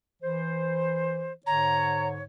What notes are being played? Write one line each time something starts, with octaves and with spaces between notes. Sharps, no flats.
E3 C5
G#2 D3 C#5 A#5